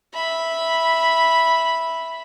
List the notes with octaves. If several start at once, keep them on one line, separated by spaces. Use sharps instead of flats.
E5 B5